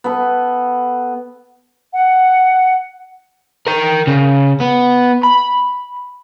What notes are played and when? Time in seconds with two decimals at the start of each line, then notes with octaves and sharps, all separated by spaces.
0.04 B3 A4
1.93 F#5
3.67 A#4 G5
4.07 C#3
4.60 B3
5.24 B5